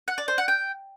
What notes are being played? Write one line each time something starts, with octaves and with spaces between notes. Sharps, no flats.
F#5
D5
C5
F#5
G5